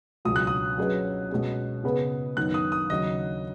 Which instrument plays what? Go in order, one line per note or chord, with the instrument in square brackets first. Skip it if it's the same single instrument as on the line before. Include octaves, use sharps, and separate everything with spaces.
[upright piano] C#2 B2 F#3 [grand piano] D#6
[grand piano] F#6
D#6
[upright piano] F#3 C#4 G#4 B4 D#5
B2 G#3 C#4
C#3 B3 G#4 B4
[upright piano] F#2 D#3 B3 D#4 [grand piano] F#6
[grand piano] D#6
D#6
[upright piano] D#2 C#3 F#3 [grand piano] D#5